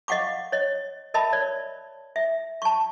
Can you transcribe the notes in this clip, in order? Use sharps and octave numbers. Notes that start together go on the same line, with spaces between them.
D#5 F5 F#5 C#6 D6
C#5 D#5
A#4 D#5 E5 A5 B5
C#5 D5
E5
A5 C#6